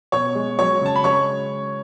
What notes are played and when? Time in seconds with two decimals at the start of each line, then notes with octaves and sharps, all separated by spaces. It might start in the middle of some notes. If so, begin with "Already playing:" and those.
0.12 B2 C#5 C#6
0.35 G#3
0.59 F#3 C#5 C#6
0.81 C#3 A5
0.96 B5
1.04 G#3 C#5 C#6